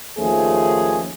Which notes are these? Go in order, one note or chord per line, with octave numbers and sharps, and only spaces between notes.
D#2 F3 A3 C#4 G#4 C5